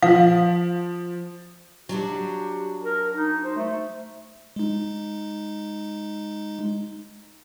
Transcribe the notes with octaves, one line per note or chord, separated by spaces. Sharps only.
F3 F5
F#3 D4 F#4 G4
A#4
D#4
C5
A3
G#3 D#4